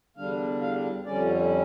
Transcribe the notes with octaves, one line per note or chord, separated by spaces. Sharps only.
E2 D3 G3 D4 F5
F5
F2 D3 G3 C#4 D5